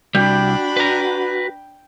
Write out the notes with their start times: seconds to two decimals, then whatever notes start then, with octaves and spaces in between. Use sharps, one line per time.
0.15 C2 G3 D4 F#4 G5 B5
0.77 B4 A#5